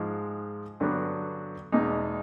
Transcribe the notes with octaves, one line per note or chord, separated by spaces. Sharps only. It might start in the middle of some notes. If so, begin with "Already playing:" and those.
Already playing: G#2 F3 G#3
G2 D3 F#3 B3
E2 B2 G#3 D#4